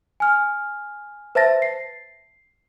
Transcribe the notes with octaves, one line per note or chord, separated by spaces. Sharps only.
G#5 F6
B4 C5 E5 A5 A6 A#6
C7